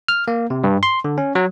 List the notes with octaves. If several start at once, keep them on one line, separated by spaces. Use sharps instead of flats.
F6
A#3
C3
G2
C6
D3
C#4
F#3